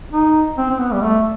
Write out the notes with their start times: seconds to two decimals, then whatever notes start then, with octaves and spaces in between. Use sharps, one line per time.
0.13 D#4
0.58 C4
0.70 C4
0.80 B3
0.93 G3
1.02 A3